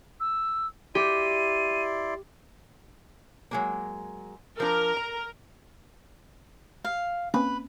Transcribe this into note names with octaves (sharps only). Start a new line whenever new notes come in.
E6
E4 G4 D5 C6 D#7
F#3 G#3 A#3
F3 D4 A#4
A#5
F5
A#3 C4 C#4 B4